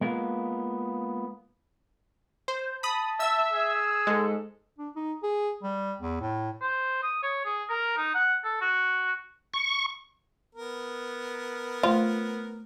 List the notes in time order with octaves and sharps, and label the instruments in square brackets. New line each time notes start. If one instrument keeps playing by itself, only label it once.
[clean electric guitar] G#3 A#3 B3 F4
[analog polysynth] C5
[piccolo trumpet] A5 [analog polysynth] B5 D#6
[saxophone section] E5 [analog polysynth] E6
[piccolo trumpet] G#4
[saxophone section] G#2 A4 [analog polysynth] G#3
[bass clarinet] D4
D#4
G#4
G3
E2
A2
[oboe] C5
D#6
C#5
G#4
A#4
D#4
F#5
A4
F#4
[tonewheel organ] C#6
[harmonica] B3 A#4
[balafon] A3 C5 [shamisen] F4